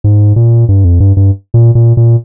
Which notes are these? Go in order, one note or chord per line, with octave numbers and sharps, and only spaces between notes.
G#2
A#2
G2
F2
G2
G2
A#2
A#2
A#2